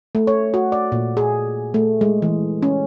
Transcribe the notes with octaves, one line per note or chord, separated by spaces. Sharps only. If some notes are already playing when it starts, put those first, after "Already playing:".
A3
C#5
F#4
D5
A#2
G#4
A3
G#3
E3
C#4